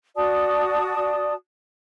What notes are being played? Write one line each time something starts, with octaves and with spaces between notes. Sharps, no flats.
F#4 D5 A5 D#6